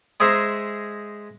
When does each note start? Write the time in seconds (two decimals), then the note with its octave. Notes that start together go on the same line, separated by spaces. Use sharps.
0.20 G#3 G#4 C5 E5 A#5